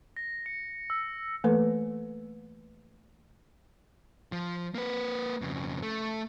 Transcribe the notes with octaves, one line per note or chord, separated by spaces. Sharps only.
A#6
C#7
E6
E3 A3 A#3 A4 B4
F3
A#3 B4
F2 C#3
A3